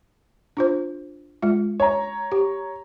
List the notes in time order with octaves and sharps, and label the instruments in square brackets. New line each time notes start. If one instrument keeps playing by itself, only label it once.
[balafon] D4 F4 C5
G#3 F4
[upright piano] C#5 A#5
[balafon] G4